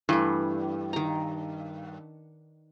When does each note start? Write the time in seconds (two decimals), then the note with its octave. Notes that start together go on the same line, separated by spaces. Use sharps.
0.09 G2 E3 A3
0.93 D#3 A#5